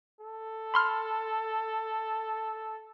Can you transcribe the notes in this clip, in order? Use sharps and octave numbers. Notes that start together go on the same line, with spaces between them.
A4
B5 C6 F6